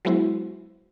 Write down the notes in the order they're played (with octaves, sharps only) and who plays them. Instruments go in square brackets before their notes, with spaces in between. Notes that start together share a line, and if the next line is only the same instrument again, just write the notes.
[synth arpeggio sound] F#3 G#3 B3 E4 F#4 C5